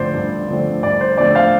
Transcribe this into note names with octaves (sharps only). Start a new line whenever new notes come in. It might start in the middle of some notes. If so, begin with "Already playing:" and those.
Already playing: G2 D3 F3 A3 C4 C5 D5
G2
D3 F3 A3 C4
G2 D5
C5
D3 F3 A3 C4 D5
C5 F5